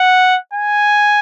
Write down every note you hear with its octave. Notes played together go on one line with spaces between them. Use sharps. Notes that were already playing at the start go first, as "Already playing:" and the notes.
Already playing: F#5
G#5